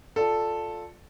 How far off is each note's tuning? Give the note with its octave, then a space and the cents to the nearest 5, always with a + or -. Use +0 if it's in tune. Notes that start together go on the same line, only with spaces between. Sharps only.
F4 +20 A4 +0 D5 +10